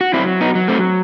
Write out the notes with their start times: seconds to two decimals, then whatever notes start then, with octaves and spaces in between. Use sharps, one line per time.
0.01 F#4
0.14 F#3 C4 E4
0.41 B3 D#4
0.55 F#3
0.68 A3 C4